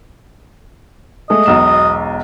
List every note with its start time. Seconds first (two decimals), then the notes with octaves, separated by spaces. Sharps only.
1.30 G#3 A3 D#5
1.46 E1 B1 E7